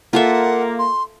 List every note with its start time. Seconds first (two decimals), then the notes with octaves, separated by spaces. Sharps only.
0.13 A#3 F4 A4 E5 F#5
0.79 C6